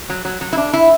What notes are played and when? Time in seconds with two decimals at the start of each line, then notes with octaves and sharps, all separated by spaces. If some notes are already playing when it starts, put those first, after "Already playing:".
0.10 F#3
0.25 F#3
0.41 F#3
0.53 E4
0.57 D4
0.73 E4